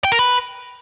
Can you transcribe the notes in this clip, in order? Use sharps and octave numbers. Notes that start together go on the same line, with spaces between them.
G5
A#4
B4